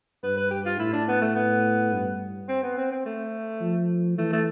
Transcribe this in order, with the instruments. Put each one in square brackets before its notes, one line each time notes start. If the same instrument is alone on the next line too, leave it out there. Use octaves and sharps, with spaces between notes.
[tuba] G2 [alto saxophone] B4
[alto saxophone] B4
G4
F4
[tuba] A2 [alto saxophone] E4
[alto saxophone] D4
B3
A3
B3
[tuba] G2
[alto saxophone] C4
B3
C4
C4
A3
[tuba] F3
[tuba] E3 [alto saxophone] A3
[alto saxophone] A3